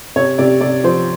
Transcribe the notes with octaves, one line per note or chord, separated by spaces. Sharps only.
C3 C#5
C3 D5
C3 D5
F3 C5